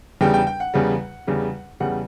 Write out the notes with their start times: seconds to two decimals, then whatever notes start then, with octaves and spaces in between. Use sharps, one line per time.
0.21 E2 C#3 G3 G5
0.34 G5
0.47 G5
0.60 F#5
0.74 E2 C#3 G3
1.27 E2 C#3 G3
1.80 E2 C#3 G3 F#5